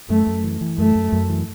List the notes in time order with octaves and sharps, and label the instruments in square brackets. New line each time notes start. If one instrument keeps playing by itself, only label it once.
[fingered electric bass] F#2 [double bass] A3
[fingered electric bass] F#2
E3
E3
[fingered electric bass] F#2 [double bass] A3
[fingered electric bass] F#2
F#2
E3